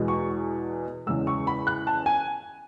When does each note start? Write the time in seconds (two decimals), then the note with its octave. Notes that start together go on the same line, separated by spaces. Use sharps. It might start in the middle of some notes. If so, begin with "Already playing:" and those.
Already playing: E2 B2 G#3
0.08 C#6
1.07 E2 C#3 G#3 E6
1.27 C#6
1.47 B5
1.67 F#6
1.87 A5
2.06 G#5